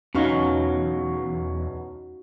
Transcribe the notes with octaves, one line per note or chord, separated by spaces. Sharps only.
E2 B2 F#3 C#4 D#4 F#4 F5 C#6